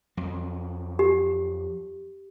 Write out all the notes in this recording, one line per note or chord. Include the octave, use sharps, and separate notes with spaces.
F2 F#3
G4